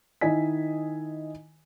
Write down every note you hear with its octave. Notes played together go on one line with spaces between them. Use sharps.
D#3 E4 D#5 G#5 B6